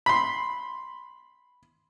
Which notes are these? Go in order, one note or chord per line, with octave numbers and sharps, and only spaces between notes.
B5 C6